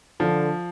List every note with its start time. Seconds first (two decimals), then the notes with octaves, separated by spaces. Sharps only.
0.20 D3 F3